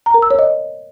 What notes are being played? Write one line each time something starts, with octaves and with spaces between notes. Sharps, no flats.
A#5
A#4
E6
C#5
D#5